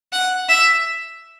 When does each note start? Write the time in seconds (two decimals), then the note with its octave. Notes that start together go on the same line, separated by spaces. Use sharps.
0.13 F#5
0.49 E5